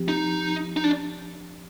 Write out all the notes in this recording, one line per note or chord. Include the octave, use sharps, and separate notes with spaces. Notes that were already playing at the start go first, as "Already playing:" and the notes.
Already playing: F3 C4 G4
D#4
D#4
D4